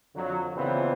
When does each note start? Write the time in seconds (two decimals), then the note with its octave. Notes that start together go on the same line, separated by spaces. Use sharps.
0.15 F2 D3 F#3
0.55 A#2 C#3 E3 B3 C4